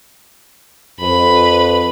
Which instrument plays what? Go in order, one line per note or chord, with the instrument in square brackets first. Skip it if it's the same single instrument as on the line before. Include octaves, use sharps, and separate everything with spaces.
[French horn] F2 [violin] B4 B5